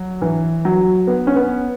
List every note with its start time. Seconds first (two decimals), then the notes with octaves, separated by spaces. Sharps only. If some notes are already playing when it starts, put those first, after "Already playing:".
Already playing: F#3
0.22 E3
0.65 F#3
1.07 B3
1.27 C#4
1.36 B3